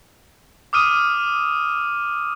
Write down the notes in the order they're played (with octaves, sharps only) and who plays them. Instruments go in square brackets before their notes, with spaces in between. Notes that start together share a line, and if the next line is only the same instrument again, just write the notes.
[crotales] D6 D#6 F6 D#7